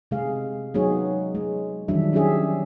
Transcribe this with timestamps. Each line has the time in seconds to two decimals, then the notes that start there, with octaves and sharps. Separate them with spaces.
0.11 C3 G#3 G#4 F5
0.74 F#3 G#3 B3 D#4 G#4 C#5
1.35 G#3
1.88 D#3 E3 F#3 G3 D4 E5
2.13 F#3 C#4 D4 G4 G#4 E5